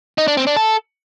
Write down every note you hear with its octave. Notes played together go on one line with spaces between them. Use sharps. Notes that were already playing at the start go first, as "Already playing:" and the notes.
D#4
D4
C4
D4
A4